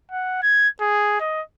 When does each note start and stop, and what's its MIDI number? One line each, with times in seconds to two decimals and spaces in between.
0.12 0.41 78
0.43 0.68 92
0.81 1.16 68
1.20 1.42 75